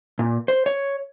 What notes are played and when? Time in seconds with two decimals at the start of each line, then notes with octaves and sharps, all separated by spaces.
0.19 A#2
0.48 C5
0.66 C#5